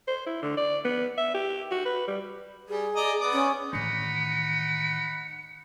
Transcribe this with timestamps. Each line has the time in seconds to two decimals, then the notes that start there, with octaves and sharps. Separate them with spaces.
0.08 C5
0.26 E4
0.42 D3
0.57 D5
0.85 B3
1.18 E5
1.34 G4
1.71 F#4
1.85 B4
2.07 G3
2.69 G3 G#4
2.96 D5 D#5 A#5
3.20 B3 D5 D#6
3.33 C#4
3.73 A1 D#3 D#4 F#5 B5 C#7